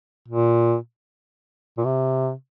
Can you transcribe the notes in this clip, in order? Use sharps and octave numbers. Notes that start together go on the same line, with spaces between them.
A#2
A#2
C3